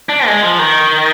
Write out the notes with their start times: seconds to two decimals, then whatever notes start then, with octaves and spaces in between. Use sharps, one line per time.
0.09 D4
0.26 G#3
0.43 F3
0.59 D#3